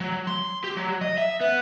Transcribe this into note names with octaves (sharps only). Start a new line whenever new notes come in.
F#3
C6
G4
F#3
D#5
E5
B3